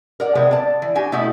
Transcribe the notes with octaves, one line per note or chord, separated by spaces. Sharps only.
A#4 D5 F#5
C3 G#3 B3 C4
D5 A5
E3
D4 F#4 G4 G#5
B2 A3 E4 F#4 G4 D#5